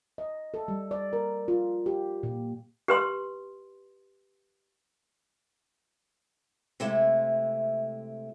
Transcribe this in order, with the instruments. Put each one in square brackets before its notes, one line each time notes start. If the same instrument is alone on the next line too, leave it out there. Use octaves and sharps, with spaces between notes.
[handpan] D#5
A4
G3
D5
A#4
F4
G4
A#2
[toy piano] G4 B4 C6
[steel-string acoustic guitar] C3 G#3 A3 C4 E4 E5